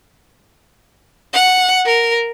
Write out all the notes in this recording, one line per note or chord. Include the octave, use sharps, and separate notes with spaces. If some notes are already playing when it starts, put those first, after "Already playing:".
F#5
A#4